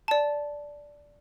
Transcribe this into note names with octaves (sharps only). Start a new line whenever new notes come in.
D5 A5